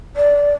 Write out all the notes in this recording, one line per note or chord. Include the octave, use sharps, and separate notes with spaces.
D5